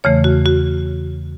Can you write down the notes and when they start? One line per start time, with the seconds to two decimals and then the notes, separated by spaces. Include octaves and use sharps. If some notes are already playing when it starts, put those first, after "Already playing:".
0.04 E2 C#3 E3 A3 C#5
0.24 F#4
0.46 F#4